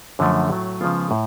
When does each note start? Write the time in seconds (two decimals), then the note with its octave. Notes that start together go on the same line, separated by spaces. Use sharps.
0.19 F#2 D3 F3 A3
0.50 A2 F#3 A3
0.81 C#3 F3 G#3 B3 F4
1.11 A2